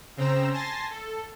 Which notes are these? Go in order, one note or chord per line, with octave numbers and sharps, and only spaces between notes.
C#3 C4 C5 A#5 E6 E7
G#5 A5 C6 A6 A#6 C7
A4